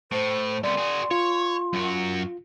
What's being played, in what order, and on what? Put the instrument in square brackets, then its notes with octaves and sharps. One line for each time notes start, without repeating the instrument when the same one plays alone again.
[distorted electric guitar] A2 [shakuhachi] C5
[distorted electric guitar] C2 B3 [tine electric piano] D5 [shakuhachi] C6
[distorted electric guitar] F#4 G#4
[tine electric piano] F4 [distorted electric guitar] C#5
[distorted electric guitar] F#2 F#4